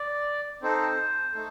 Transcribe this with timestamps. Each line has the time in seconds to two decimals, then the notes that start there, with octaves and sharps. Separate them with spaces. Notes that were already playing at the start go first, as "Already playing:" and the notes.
Already playing: D5
0.62 C4 D#4 A4 C5
1.34 A3 D#4 A4